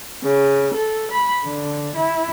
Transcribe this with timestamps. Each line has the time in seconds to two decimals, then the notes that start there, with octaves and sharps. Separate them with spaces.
0.23 C#3
0.74 A4
1.10 B5
1.43 D3
1.94 E4